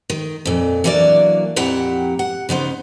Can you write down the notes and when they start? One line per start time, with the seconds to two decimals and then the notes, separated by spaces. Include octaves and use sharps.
0.10 D#3
0.45 F2 A#2
0.84 E3 F#3 A#3 D4 D5
1.56 F2 A#2 E4 G4 F#5 A#5
2.19 F#5
2.49 C#3 B3 D#4 C5